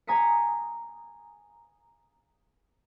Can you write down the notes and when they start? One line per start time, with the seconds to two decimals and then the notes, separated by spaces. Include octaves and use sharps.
0.07 G#5 A#5 D#6 B6 C#7